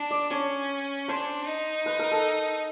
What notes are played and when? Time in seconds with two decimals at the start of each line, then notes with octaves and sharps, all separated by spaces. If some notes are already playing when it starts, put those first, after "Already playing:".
Already playing: D4
0.11 D5
0.31 C#4 C#5
1.08 D4 C5
1.47 D#4
1.86 B4
1.99 A#4
2.11 A4